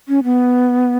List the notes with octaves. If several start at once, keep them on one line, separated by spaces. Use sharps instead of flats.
C#4
B3